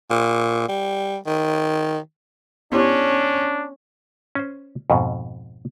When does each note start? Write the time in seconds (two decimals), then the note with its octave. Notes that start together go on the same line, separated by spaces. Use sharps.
0.10 A#2
0.68 G3
1.26 D#3
2.72 B3 C#4 D4 E4 G4
4.35 C#4 C5
4.90 F2 G#2 B2